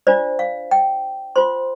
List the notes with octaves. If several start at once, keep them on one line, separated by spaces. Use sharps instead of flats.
D4 F4 C5 D5
F5
G5
F4 C5 C6